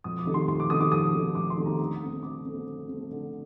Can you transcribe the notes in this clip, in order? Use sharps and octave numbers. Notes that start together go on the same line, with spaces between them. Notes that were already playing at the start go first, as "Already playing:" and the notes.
F2 D#6
D6
C3 D#3 A3
C6
F2 C6
D6
C3 D#3 A3 D#6
D6
F2 D#6
C3 D#3 A3
F2 D6
C6
C3 D#3 A3
A#5
D3 A#5
A3 C4
D3 D6
A3 C4
D3
A3 C4
D3